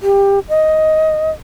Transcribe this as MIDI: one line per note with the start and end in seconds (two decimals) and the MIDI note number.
0.01 0.39 67
0.49 1.30 75